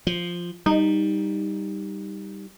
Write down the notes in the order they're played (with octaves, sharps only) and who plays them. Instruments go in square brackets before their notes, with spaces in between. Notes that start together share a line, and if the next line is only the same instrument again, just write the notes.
[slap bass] F3
[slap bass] G3 [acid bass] D#4